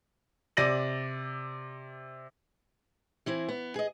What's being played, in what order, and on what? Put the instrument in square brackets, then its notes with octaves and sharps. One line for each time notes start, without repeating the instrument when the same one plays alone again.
[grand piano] C3 D5 A#6 D#7 F#7
[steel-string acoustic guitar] E3 C4 E4
B3
G#4 D#5